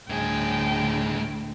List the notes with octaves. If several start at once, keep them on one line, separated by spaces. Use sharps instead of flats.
D2 A2 G#4 G5